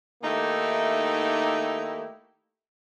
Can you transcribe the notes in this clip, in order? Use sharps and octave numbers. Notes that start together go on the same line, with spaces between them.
D#3 A3 A#3 D#4 E4 G4